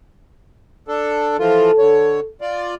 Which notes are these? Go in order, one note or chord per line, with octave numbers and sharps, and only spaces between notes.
D4 A4
E3 F3 F4 A4
D3 C#5
F4 D5